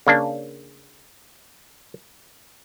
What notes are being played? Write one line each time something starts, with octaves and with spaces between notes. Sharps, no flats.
C#3 A#3 D4